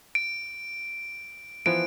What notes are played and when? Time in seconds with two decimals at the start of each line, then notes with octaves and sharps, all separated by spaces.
0.15 D7
1.66 E3 F3 B3 D7